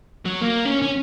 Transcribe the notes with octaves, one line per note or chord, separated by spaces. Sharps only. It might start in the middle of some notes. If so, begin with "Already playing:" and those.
F#3
A#3
C#4
C#4